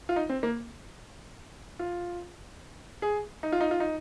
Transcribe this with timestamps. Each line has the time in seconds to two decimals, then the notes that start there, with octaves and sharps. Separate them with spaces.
0.09 F4
0.16 D#4
0.29 C4
0.43 A#3
1.79 F4
3.02 G#4
3.43 D#4
3.52 F4
3.61 D#4
3.71 F4
3.80 D#4